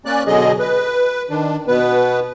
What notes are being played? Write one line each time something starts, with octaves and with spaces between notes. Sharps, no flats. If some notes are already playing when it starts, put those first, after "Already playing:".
A#3 C#4 D5 F#6
B2 D3 F#3 G#4 D#5
B4
D#3 D4
B2 B3 B4